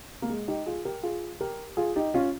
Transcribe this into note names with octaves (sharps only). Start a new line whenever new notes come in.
A#3
G#3
D#4 G4
F4 G#4
G4 A#4
F4 G#4
G4 A#4
F4 G#4
D#4 G4
C#4 F4